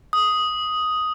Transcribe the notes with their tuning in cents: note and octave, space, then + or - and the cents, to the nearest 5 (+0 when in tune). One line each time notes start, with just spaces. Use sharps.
D#6 +5